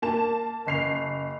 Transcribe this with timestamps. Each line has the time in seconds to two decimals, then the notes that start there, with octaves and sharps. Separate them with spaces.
0.02 A#3 A5 E7
0.67 F#1 C7 F7